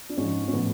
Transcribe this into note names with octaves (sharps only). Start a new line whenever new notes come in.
D4
G#2 F3 C#4
C#4
A2 F3 B3